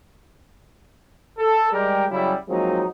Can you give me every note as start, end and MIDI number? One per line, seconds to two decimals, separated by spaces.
1.39 1.70 69
1.73 2.05 55
1.73 2.05 56
1.73 2.05 67
1.73 2.05 70
2.10 2.34 49
2.10 2.34 54
2.10 2.34 55
2.10 2.34 64
2.49 2.84 53
2.49 2.84 54
2.49 2.84 56
2.49 2.84 58
2.49 2.84 60
2.49 2.84 63